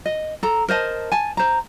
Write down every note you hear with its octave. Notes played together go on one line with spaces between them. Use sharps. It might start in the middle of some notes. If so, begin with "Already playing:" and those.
D#5
A4 A#5
A#4 C5 D#5 A5
G#5 A5
C5 A#5